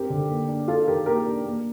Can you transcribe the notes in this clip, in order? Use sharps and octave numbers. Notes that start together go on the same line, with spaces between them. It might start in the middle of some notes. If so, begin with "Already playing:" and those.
Already playing: C4 G4 A#4
D3
A#3
D4
D4 F4 A4
D#3 G4 A#4
A#3 G4 A#4
D4
A#3